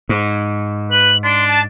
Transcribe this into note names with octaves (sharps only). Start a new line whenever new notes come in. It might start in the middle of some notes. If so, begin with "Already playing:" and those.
G#2
B4 F#7
D4 C6
A5